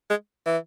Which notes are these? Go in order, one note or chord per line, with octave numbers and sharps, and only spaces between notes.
G#3
E3